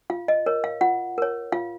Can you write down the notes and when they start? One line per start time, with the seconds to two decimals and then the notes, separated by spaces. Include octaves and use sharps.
0.10 F4 F5
0.28 D#5
0.46 A#4 C#5
0.64 F5
0.81 F4 F#5
1.18 A#4 C#5
1.52 F4 F5